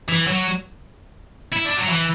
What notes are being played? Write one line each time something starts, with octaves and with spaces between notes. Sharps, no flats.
E3
F#3
E4
D4
F#3
E3